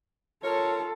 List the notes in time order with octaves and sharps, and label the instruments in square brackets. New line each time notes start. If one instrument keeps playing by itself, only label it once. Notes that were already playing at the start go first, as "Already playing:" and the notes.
[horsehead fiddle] F4 A4 [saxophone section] A#4 C#5